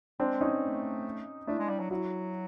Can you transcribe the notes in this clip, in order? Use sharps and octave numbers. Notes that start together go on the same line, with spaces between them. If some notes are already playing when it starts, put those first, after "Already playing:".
G#3 C4 D4
C#4 D#4
A3
A3 D4 E4
G#3
G3
F#3
F#3 E4 F#4